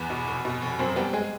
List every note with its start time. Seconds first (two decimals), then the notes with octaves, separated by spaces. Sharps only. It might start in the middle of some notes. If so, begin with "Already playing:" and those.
Already playing: E2 B3 B4
0.10 B2
0.27 F1
0.45 B2
0.62 F1
0.79 F#2 C4 C5
0.96 G3 B3 G4
1.13 G#3 G#4